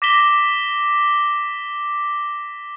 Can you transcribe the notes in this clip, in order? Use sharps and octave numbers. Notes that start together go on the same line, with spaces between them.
D6 A#6 B6 E7 G7